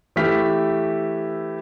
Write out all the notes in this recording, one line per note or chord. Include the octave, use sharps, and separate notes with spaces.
E3 A3 G4 F6 B6